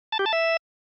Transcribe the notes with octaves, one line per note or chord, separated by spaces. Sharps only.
A5
G4
A5
E5